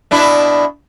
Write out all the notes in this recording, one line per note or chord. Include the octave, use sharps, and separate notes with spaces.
B2 D4 E4